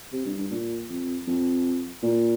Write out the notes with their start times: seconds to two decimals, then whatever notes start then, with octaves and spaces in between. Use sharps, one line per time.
0.13 C3
0.26 G2
0.38 G2
0.51 A#2
0.90 F2
1.27 F2
2.03 A#2